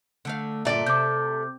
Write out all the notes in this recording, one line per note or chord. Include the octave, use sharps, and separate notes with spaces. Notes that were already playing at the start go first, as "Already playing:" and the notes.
D3 A3 F5
D2 G2 A#2 A3 D5
C3 D6 G6